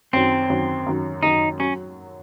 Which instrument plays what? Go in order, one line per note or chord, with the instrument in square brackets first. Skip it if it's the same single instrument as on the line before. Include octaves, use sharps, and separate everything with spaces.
[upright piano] F#2 D#3 F#3 [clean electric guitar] C4
[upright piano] F#2 D#3 F#3
F#2 D#3 F#3
[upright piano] F#2 D#3 F#3 [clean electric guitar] D#4
[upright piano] F#3 [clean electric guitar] C#4